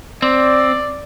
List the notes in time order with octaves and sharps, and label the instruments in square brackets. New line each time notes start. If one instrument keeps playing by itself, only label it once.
[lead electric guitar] C4 [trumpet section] D5